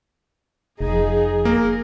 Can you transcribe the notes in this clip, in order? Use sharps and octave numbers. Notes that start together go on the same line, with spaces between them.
F1 F3 D#4 G#4
A#3 A#4